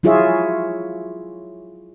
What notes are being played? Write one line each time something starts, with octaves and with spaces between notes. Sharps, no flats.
F#3 E4 F4 G#4 C#5 E5